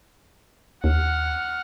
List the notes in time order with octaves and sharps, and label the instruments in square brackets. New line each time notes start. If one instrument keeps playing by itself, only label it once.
[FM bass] D#2 [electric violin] F#5 F6